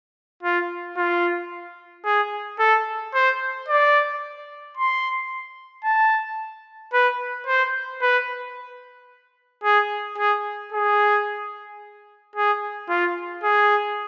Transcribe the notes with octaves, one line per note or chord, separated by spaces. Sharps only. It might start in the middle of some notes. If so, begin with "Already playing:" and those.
F4
F4
G#4
A4
C5
D5
C6
A5
B4
C5
B4
G#4
G#4
G#4
G#4
F4
G#4